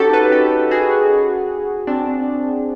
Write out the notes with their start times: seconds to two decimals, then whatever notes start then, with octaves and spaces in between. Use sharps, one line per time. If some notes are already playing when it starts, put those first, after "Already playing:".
Already playing: C#4 D#4 F#4 G4 A4
0.13 A4 B4
0.32 G4 A4
0.71 F#4 G#4
1.87 C4 D4